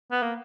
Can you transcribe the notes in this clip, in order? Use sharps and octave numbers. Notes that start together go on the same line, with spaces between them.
B3
A#3